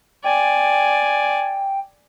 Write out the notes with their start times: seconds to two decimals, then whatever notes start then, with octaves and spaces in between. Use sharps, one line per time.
0.24 D5 G5 G#5